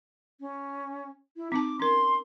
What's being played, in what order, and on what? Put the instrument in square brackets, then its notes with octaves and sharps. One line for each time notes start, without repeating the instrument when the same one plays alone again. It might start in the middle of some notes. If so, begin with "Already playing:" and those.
[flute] C#4
E4
[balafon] C4 D#4 A5 [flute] D6
[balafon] C#4 A#4 [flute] C6